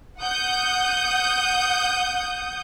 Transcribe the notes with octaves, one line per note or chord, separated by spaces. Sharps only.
F#5 D#6 G6